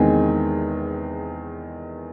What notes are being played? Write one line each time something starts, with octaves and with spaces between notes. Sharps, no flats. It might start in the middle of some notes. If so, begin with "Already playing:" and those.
Already playing: E2 C3 D#3 G#3 C4 G#5